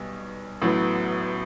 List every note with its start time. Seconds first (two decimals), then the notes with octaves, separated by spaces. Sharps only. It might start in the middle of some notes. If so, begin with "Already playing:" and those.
Already playing: B1 B2 G3
0.62 A1 A2 F#3 B3